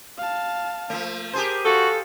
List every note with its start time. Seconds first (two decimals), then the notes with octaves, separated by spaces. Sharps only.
0.18 F5 A5
0.90 F3 A3
1.33 G4 G#4 A#4 C5 A5
1.65 F#4 A4 F5